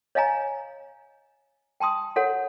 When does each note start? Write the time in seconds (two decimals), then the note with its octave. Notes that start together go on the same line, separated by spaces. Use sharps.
0.15 C#5 D#5 F5 G#5 A#5
1.80 G5 A5 C6 D#6
2.16 F#4 A4 C#5 F#5